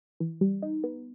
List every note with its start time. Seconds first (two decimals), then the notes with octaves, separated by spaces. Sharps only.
0.20 E3
0.41 G3
0.62 D#4
0.84 B3